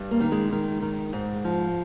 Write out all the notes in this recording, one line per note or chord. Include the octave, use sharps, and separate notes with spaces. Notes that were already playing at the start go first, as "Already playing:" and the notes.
Already playing: G2
A#3
D#3
G#3
D#3
D#3
G#2
F3